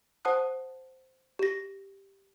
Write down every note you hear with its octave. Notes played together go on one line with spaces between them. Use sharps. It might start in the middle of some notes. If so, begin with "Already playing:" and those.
C5 F#5 A5 D#6 F#6
G4 A#6